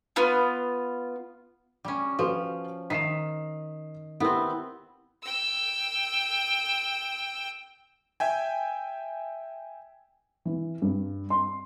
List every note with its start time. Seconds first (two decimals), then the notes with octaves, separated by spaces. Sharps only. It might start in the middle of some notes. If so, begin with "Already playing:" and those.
0.16 B3 F4
1.85 G3 C#4
2.19 F3 F#4 B4 C#5
2.90 D#3 B6 C7 E7
4.20 B3 C4 E4 G4 A#4
5.23 G5 E6
8.20 E5 G5 G#5
10.45 E3
10.82 G2
11.30 C6